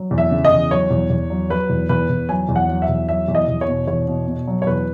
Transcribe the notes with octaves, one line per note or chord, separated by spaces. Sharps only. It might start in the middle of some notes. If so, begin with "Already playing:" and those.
Already playing: F#3
E2
E5
C#3
D#5
E2
F#3 C#5
E2
E2
F#3
F#3 B4
E2
E2 B4
E2
F#3 G#5
E2
F#5
F#3
E5
E2
F#3 E5
E2
D#5
E2
C#5
B2
E2 C#5
B2
B2
F#3
C#5
E2 B4